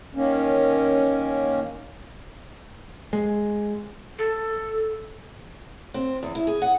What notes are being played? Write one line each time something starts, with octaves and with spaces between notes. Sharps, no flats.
D#3 A#3 C#4
G#3
A4
C4
E2
E4
G#4
F#5